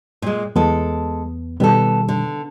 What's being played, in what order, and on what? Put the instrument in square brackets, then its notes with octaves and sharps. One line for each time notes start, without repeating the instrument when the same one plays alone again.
[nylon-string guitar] A#2 G#3
[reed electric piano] E2 B3 [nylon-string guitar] G#3 A4
[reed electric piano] B2 D#3 G3 [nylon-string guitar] B3 A4
[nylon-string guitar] D3